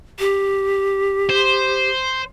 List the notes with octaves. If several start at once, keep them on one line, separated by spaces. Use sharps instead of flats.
G4
C5